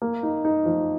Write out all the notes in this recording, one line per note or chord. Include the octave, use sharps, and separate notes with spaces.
A#3
D#4
D#4
F3